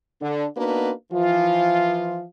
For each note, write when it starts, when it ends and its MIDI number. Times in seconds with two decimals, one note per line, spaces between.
0.21 0.45 50
0.57 0.92 58
0.57 0.92 59
0.57 0.92 62
0.57 0.92 63
0.57 0.92 66
0.57 0.92 71
1.12 2.25 52
1.12 2.25 53
1.12 2.25 65